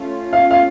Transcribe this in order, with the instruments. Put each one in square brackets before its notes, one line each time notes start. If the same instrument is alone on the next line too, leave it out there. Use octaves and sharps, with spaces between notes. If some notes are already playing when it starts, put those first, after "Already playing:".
Already playing: [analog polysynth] A3 C#4 F4
[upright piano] F5
F5